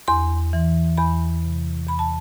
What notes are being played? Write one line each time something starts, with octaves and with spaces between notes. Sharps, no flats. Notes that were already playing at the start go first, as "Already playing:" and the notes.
E2 C6
E3
E2 B5
C3
E2 B5
A5